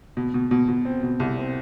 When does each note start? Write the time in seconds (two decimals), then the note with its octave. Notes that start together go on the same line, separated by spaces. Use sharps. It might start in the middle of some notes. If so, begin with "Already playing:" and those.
0.17 B2
0.34 B2
0.51 B2
0.69 B2
0.85 C4
1.03 B2
1.20 C2
1.37 C4